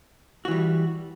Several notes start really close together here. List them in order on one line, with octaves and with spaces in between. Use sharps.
F#4 E3 G3